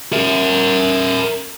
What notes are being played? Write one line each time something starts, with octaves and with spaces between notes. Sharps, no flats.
A#4 E5